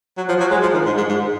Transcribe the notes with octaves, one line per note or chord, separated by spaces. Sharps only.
F#3
F3
F#3
G#3
F3
D#3
G#2
G#2
G#2